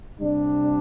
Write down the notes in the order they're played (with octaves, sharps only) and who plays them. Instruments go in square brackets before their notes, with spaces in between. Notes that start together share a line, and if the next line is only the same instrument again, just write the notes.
[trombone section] C3 G3 D4